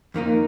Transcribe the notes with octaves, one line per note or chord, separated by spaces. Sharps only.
F2 D#3 A#3 D#4